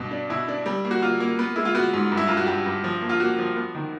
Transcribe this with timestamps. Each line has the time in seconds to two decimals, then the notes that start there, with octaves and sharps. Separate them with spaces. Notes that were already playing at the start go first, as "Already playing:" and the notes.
Already playing: G2 B2
0.11 D4
0.30 B2 E4
0.48 D4
0.66 G3
0.85 A#3
0.91 F#4
1.02 A#3 F4
1.20 A#3
1.39 B3
1.56 G#3 E4
1.65 F4
1.75 B3 F#4
1.93 G#2
2.12 G2
2.17 E4
2.27 G2 F4
2.37 F#4
2.47 G2 G4
2.66 G2
2.84 F3
3.01 A#3
3.09 F4
3.20 A#3 F#4
3.38 F3
3.57 B3
3.75 D#3